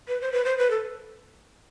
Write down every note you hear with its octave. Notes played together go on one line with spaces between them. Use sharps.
B4
C5
B4
C5
B4
A4